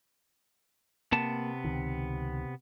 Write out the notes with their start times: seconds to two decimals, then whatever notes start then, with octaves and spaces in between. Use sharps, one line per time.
1.12 C3 A#3 B3 A5
1.65 C#2 D#3